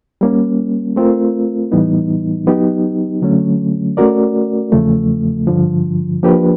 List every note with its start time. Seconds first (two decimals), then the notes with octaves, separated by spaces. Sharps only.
0.21 G3 A#3 C#4
0.96 A3 C4 F4 A#4
1.72 A2 E3 G3 B3 D#4
2.47 F#3 B3 D#4 G4
3.22 D3 F#3 A3 C#4
3.97 A3 C#4 F#4 A#4 D5
4.72 E2 C#3 F3 A3
5.47 G2 D3 F3
6.23 F3 A#3 D4 G4 B4